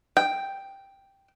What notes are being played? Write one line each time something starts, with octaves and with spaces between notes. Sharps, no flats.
G5